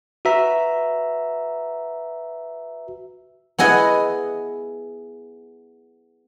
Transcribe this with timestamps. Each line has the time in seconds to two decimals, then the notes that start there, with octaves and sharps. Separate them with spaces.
0.25 F#4 B4 E5 A#5
3.58 B3 E4 G#4 D#5 F#5